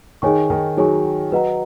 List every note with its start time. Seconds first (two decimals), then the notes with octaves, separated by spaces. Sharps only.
0.22 D#3 D#4 G#4 C#5 G#5 C#6
0.50 D#3
0.77 F#3 D#4 G#4 C#5 G#5 C#6
1.32 F#3 B4 D#5 F#5 A#5